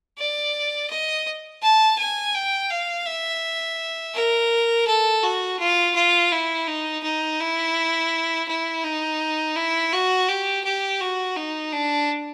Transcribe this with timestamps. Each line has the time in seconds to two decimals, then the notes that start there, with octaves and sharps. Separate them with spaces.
0.18 D5
0.90 D#5
1.62 A5
1.98 G#5
2.34 G5
2.70 F5
3.06 E5
4.14 A#4
4.87 A4
5.23 F#4
5.59 F4
5.95 F4
6.32 E4
6.67 D#4
7.03 D#4
7.40 E4
8.48 E4
8.84 D#4
9.56 E4
9.93 F#4
10.28 G4
10.64 G4
11.01 F#4
11.36 D#4
11.72 D4